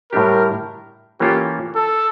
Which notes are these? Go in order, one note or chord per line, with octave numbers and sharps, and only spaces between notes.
A2 G3 D4 G4 A#4
E3 A#3 C#4 F4 G4 A4
A4